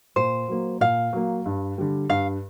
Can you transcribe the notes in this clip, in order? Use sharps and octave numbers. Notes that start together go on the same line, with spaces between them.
A#2 C5
F#3 A#3
A#2 F5
F#3 A#3
G2
D3 G3
G2 F5